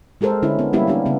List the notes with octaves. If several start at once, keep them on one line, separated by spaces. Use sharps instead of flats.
G#3 G4 A4 A#4 C5
D3 C#4 E4
B3
G3 A#3 C#4 D4 E4 G4
B3 D4 G4
C#3 B3